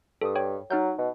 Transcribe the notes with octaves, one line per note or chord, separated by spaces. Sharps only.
G2 A4 D#6
C#5 G5
F#3 D#4 F6 G6
B2